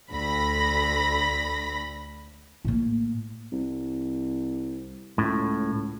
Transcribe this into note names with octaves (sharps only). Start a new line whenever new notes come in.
D2 B5 A#6
A2 A#3
C2
C#2 A2